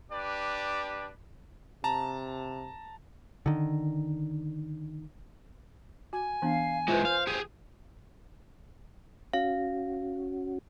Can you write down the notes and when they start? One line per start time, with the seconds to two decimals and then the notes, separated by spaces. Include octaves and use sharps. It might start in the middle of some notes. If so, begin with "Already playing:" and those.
0.11 D4 G4 B4 D5
1.84 C3 A5 A#5
3.46 D3 D#3
6.13 F#4 G#5
6.42 E3 B3 D4 F5
6.88 G#3 E4 F4 B4 C5
7.05 F5
7.27 G4 G#4
9.33 C#4 F#4 F5